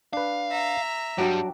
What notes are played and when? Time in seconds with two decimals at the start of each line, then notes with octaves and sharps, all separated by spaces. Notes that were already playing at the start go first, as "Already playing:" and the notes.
0.13 D4 B4 F5
0.51 E5 A#5
1.18 G2 F#3 G3 D4 F#4 G5